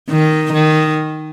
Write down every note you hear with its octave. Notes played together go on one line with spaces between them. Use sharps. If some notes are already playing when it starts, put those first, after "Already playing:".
D#3
D#3